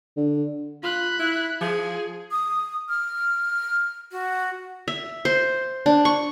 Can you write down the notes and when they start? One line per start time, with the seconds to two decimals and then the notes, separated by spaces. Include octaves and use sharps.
0.17 D3
0.83 F4 B5 F#6
1.19 E4
1.61 F3 G#4
2.31 D#6
2.89 F6
4.11 F#4
4.88 E5
5.25 C5
5.86 D4
6.05 C#6